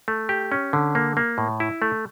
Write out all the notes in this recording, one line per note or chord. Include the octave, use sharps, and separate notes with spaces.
A3
G4
C#4
D3
A#3
A#3
A2
E4
A3